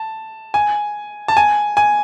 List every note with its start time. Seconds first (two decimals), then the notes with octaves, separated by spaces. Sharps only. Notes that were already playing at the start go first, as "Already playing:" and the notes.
Already playing: A5
0.54 G#5
1.28 A5
1.37 G#5
1.77 G#5